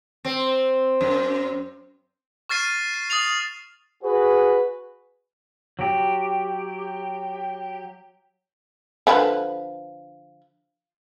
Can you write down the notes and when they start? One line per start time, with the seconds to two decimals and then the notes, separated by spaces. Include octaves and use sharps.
0.25 C4
1.01 F#2
2.49 C#6 F6 A6 C7 D#7
2.94 C7
3.10 D#6 A6 C7 F7
4.03 F#4 G#4 B4
5.79 F#3 G4
9.07 D3 F3 B4